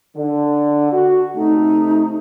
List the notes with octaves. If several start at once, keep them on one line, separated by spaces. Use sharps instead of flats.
D3
F#4
C3 A3 D#4